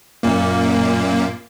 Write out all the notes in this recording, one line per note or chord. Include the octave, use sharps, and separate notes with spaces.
F#2 A#2 A#3